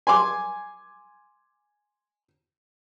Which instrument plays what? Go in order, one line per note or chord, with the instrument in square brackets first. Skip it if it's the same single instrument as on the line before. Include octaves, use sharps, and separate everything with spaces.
[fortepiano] G#5 C6 D6